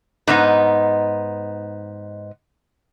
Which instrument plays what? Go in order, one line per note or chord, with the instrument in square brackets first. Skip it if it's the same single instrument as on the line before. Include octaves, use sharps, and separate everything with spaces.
[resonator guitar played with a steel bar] G#2 B3 D#4